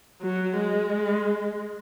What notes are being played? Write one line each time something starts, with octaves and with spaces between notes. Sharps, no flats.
F#3
G#3